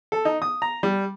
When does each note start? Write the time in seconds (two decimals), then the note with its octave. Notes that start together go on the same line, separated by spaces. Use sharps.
0.12 A4
0.25 D#4
0.42 D#6
0.62 A#5
0.83 G3